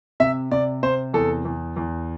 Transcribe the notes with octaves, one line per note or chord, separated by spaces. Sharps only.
C3 E5
C3 D5
C3 C5
E2 A4
E2
E2